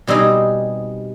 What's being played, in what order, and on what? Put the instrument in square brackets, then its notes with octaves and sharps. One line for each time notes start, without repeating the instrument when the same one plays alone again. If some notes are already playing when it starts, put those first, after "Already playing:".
[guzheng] B2 G3 C4 D#4 G#4